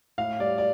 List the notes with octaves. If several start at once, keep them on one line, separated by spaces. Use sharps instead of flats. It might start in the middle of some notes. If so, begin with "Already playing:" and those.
A2 F5
G3 D5
D5